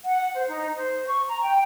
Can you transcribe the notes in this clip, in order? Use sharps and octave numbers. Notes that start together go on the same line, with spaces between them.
F#5
C5
D#4
C5
C#6
A#5
G5